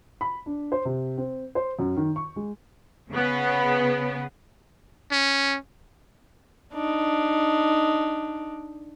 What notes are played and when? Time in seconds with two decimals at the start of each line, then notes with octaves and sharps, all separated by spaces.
0.21 B5
0.46 D4
0.72 C5
0.85 C3
1.17 C4
1.55 C5
1.79 F#2
1.97 D#3
2.16 C#6
2.36 G#3
3.10 C#3 B3
5.12 C#4
6.74 D4 D#4